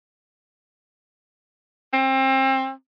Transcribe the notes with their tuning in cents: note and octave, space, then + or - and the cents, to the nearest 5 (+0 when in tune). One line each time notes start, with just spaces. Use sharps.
C4 +30